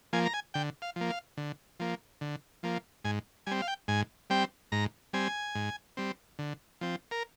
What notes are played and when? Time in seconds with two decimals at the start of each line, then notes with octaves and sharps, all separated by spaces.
0.13 F3 A#3 G#5
0.26 A#5
0.34 G#5
0.54 D3 G5
0.82 F5
0.96 F3 A#3
1.10 F5
1.37 D3
1.80 F3 A#3
2.21 D3
2.63 F3 A#3
3.04 G#2 G#5
3.47 G3 C4 G#5
3.62 F5
3.68 G5
3.88 G#2 G#5
4.30 G3 C4 G5
4.72 G#2 A#5
5.13 G3 C4 G#5
5.55 G#2
5.97 G3 C4
6.39 D3
6.81 F3 C4
7.11 A#4